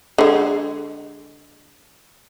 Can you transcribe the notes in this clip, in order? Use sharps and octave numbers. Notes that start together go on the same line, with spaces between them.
D3 G#3